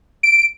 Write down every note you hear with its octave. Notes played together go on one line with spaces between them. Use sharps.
D7